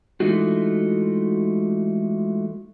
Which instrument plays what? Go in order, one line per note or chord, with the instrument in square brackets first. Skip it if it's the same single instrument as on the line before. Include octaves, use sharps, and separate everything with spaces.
[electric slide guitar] E3 G#3 A3 D#4 F4 F#4